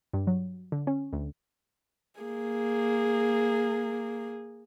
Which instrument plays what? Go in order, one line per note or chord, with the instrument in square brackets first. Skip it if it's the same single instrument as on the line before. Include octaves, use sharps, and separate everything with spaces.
[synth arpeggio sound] G2
F#3
D3
C#4
D2
[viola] A#3 G#4